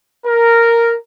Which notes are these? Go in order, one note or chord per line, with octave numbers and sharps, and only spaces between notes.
A#4